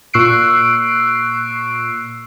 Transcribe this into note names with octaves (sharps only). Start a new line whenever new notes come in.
A#2 C#6 E6 F#6 C7 D7